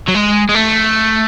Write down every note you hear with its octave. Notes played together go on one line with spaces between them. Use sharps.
F#3
G#3
G#3
A3